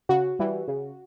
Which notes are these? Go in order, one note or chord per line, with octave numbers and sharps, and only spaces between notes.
C#3 F#4
E3 G3
C#3